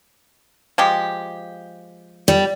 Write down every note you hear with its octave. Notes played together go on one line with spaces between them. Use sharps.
F3 G#3 G4
G3